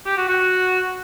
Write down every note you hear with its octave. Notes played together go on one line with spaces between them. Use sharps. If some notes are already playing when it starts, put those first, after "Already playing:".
G4
F#4
F#4